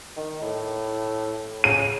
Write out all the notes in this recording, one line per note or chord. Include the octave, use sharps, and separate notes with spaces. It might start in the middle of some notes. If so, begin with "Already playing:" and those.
D#3
A2
C#3 D#7